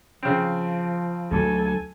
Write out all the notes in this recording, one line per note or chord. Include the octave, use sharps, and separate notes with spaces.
C#3 F3 C4
D2 F#3 A4 G#5